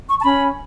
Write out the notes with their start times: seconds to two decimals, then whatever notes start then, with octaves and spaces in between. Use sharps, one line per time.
0.09 C#6
0.20 A5
0.24 C#4 B5